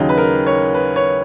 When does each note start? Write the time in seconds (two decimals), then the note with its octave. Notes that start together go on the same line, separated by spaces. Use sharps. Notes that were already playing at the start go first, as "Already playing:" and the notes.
Already playing: D#2 C#3 F#3 D#4
0.09 B4
0.18 A#4
0.47 C#5
0.74 B4
0.96 C#5